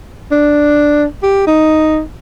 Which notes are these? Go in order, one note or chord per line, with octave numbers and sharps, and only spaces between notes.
D4
G4
D#4